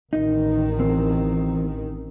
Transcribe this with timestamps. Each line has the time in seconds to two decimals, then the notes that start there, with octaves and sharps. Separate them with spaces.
0.13 A1 D#3 D#4
0.79 E3 C4